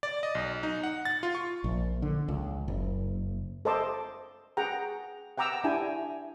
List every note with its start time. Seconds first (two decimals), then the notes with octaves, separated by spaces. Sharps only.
0.03 D5
0.23 D#5
0.35 B1
0.63 D#4
0.83 F#5
1.05 A6
1.23 F4
1.35 C#6
1.64 A#1
2.02 D3
2.28 C#2
2.68 F#1
3.65 A4 C5 D#5 A5 C6 D6
4.57 G#4 F#5 G5 A#5
5.38 F#5 G5 A#5 D6 E6
5.64 D4 E4 G4 G5 G#5